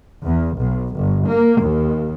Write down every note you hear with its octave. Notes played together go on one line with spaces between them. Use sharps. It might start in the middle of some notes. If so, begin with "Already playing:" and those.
E2
B1
G1
A#3
D#2